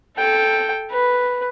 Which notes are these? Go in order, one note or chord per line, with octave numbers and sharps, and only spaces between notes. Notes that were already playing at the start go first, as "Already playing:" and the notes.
A4 G5
B4